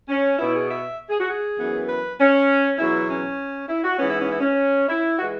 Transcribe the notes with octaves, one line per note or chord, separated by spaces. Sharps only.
C#4
B2 B3 E4
G#4
E5
G#4
F#4
G#4
F#2 E3 B3
B4
C#4
E2 B2 F#3 E4
C#4
E4
F#4
G#2 E3 B3 C#4
E4
C#4
E4
C#4
E4
E3 G#3 F#4